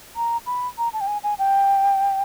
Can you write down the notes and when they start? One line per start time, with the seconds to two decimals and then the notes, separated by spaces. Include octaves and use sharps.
0.16 A#5
0.46 B5
0.78 A#5
0.93 A5
1.01 G5
1.07 G#5
1.23 G#5
1.39 G5